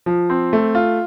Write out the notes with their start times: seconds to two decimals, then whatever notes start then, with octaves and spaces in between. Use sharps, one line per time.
0.06 F3
0.30 C4
0.53 A3
0.75 F4